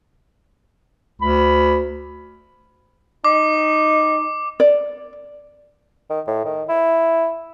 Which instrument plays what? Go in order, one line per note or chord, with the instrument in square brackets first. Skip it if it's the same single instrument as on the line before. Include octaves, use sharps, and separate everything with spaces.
[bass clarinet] D2 [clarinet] B5
[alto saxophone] D#4 [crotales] D6
[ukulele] D5
[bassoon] D#3
A2
D#3
E4